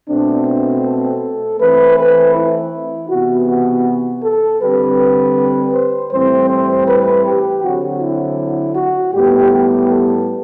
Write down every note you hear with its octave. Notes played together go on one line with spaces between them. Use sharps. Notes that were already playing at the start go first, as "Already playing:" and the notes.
B2 A3 C4 D4
D4
A4
E3 A3 C4 B4
B4
E4
C3 E3 B3 F#4
F#4
A4
D3 G3 C4 B4
C5
A2 E3 G3 C4 C5
C5
B4
G4
D3 F#3 C4 F#4
E4
F#4
A2 G3 B3 G4
G4
A4